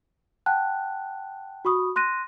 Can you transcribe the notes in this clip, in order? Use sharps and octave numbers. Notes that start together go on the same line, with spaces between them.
F#5 G5 A5 F#6
F#4 B5 C#6 D#6
C6 F#6 A#6 D#7